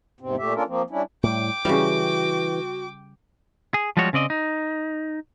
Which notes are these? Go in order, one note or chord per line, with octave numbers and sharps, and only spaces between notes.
E2 G#2 C3 C4
A#2 A3 G4 E5
A#3 C#4 D4 F4 A4 A#4
F3 A#3 C4
G3 C#4 D4 E4
A2 G3 G5 D6
C#3 E3 G3 F#4
G#4
F3 G3 G#3 F#4 C#5
C#3 C4 D5 D#5
D#4